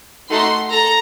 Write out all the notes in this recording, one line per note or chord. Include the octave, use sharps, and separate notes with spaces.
A3 D#4 F#4 A4 C6
A4 A#5